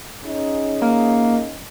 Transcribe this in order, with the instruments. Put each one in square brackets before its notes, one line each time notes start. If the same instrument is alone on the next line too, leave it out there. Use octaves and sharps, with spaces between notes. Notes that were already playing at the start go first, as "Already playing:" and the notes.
[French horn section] C#4 D#4 G#4
[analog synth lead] A#3